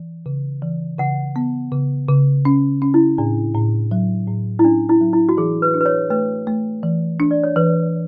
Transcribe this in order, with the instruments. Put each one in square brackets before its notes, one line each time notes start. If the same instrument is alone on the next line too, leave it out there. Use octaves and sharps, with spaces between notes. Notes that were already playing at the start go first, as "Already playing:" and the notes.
Already playing: [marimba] E3
C#3
E3
[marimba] C#3 [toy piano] F#5
[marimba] B3
C#3
C#3
C#4
C#4
[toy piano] E4
[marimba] A2 [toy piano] D4
[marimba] A2
F#3
A2
[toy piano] E4
[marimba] C#4 [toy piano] D4
[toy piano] E4
[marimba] F#3
[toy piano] E4
F#4
[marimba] E3 [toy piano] G#4
[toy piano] B4
[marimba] D4
[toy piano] B4
C#5
[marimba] A3 [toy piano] B4
[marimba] A3
E3
D4
[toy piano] D5
C#5
[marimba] E3 [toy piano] B4